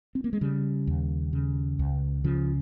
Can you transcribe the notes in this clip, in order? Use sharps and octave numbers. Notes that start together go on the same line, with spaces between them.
C4
A#3
G#3
C#3 G3
D#2
C#3
C#2
C#3 F3